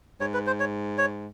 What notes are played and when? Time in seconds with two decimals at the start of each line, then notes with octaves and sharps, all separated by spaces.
0.20 G#2 C#5
0.34 B4
0.47 C5
0.60 C#5
0.98 C#5